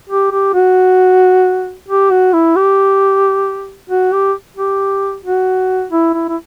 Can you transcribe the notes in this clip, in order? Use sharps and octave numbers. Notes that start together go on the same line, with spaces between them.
G4
G4
F#4
G4
F#4
E4
G4
F#4
G4
G4
F#4
E4
E4
E4